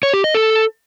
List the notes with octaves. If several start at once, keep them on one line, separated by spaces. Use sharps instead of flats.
C#5
G4
D#5
A4